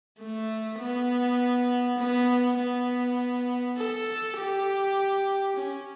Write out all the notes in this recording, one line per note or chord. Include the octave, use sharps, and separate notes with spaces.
A3
B3
B3
B3
A4
G4
C#4